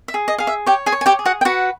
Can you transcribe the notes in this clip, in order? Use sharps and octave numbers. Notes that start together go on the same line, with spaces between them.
E5
G#4
D#5
G#4 F5
E5
G4 C#5 G5
G#4 G#5
C#5
G#5
G4 G5
G#4
F#4 F#5
G5
F#4 B4 F#5